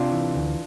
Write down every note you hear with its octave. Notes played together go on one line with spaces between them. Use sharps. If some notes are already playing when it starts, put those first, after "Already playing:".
Already playing: C3 D4 F4
E3
D2